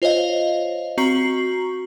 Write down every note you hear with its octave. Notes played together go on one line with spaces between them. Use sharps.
F4 C5 C#5 D#5 F5
C4 F#4 A#5 C#6 C7